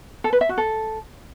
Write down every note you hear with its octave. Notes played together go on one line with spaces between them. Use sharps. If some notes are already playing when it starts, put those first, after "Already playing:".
A4
B4
E5
F#4
A4